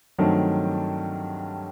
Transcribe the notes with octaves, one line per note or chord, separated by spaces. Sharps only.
G2 D#3 F#3 A3 C4